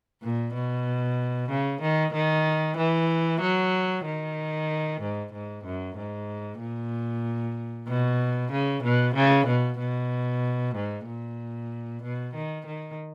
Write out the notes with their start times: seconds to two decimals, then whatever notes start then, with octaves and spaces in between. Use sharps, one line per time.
0.22 A#2
0.54 B2
1.50 C#3
1.81 D#3
2.13 D#3
2.77 E3
3.41 F#3
4.05 D#3
5.01 G#2
5.33 G#2
5.65 F#2
5.96 G#2
6.60 A#2
7.88 B2
8.52 C#3
8.84 B2
9.15 C#3
9.47 B2
9.79 B2
10.76 G#2
11.07 A#2
12.03 B2
12.35 D#3
12.67 D#3